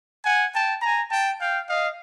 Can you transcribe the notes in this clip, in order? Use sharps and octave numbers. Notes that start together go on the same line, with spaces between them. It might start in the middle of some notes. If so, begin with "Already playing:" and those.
F#5 G#5
G5 A5
G#5 A#5
G5 A5
F5 G5
D#5 F5